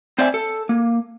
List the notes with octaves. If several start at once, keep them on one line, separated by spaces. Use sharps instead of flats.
C4 C5 D5 E5 G#5
A4
A#3